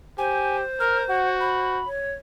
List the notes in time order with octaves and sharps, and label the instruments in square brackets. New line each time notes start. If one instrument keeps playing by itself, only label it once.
[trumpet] G4 [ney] C5 [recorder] G#5
[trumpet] A#4 [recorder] F6
[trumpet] F#4 [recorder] F#5
[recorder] B5
[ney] C#5